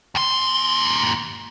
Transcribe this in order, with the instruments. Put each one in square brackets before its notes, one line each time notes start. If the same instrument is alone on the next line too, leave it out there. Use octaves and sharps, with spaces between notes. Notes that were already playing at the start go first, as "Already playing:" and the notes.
[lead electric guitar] D#2 C6